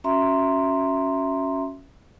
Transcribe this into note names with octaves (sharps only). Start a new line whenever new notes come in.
C#4 F#4 E5 A#5 C6